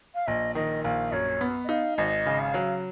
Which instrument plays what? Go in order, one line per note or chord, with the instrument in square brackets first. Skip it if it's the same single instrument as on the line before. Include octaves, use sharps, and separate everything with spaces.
[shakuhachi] F5
[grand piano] A#1 [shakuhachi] D#5
[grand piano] D#3 [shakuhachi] D#5
[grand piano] A#1 [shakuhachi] F5
[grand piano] F#2 [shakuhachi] C#5
[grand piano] B3
[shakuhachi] D#5
[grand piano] D#4 [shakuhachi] F5
[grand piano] G#1 [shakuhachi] D#5
[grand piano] C#3
[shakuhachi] F5
[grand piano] F#3